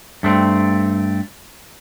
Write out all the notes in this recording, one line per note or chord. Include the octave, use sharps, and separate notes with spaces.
G2 A3 C4